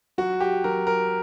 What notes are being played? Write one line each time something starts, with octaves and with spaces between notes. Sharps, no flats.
F#3 F#4
G4
F#3 A#4
A#4